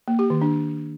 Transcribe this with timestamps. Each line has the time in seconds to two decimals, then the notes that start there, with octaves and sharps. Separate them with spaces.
0.08 A#3
0.19 G4
0.30 D#3
0.42 D4